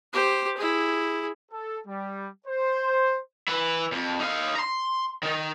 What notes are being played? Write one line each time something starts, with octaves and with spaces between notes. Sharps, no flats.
G4 C5
E4 G#4
A4
G3
C5
E3 E4
F2
D#4 F5
A#5 C6
D#3 D#4